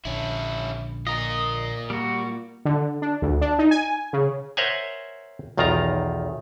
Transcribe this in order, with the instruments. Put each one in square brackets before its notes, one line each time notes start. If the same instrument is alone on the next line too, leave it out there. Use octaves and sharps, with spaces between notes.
[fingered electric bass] A#1 D3 [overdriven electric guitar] C#4 E4
[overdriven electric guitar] F4 A#4 [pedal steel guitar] D#5
[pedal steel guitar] G3 F#4 [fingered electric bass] A#3
[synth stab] D3
D4
D2
D4
D#4
G#5
C#3
[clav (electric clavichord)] A#4 C5 C#5 E5 F#5 G#5
B1 E2 D#3 F4 A#4 A#5